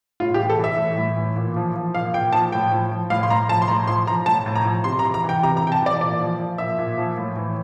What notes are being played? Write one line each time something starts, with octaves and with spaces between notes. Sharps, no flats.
A2 F4
G4
E3
A4
E3 E5
A2
A2
E3
A#2
F3
F3
A#2 F5
A#2 G5
F3 A5
A2 G5
F3
F3
A2 F5
C6
A2 A#5
F3 A5
C6
A2 A#5
F3 C6
F3 A#5
A2 A5
A2
A#5
F3
C3 C6
A#5
E3
A#5
E3
G5
C3 A#5
A#5
C3
G5
A5
E3 D5
A#2 D5
F3
F3
A#2 E5
A#2
F3
A2
E3